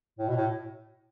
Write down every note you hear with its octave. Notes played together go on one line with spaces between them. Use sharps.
A2
B2
A2